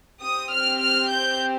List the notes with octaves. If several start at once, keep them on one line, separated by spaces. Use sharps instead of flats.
C4 G4 D#6
F6
F6
G6